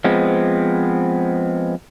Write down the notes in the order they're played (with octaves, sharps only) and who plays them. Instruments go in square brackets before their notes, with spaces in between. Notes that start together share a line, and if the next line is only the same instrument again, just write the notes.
[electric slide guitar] F3 G#3 B3 C4